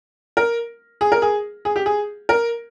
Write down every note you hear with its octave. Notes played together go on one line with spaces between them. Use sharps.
A#4
G#4
A#4
G#4
G#4
G4
G#4
A#4